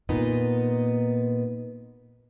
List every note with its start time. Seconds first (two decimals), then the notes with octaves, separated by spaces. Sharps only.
0.09 A#2 B3 D#4 D#5